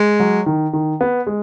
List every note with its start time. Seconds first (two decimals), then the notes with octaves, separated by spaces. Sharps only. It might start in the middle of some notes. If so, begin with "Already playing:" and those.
Already playing: G#3
0.20 F#3
0.46 D#3
0.73 D#3
1.01 B3
1.27 G#3